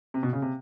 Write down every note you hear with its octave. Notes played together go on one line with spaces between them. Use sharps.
C3
B2
C#3
C3